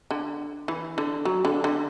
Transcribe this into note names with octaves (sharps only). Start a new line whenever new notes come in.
D3
E3
D3
F#3
D3
D3